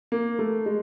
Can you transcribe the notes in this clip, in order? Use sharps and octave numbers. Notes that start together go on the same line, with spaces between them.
A#3
A3
G#3